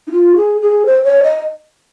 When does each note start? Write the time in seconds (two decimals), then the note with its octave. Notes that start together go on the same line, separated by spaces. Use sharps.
0.07 D#4
0.11 F4
0.36 G#4
0.61 G#4
0.86 C5
1.04 C#5
1.23 D#5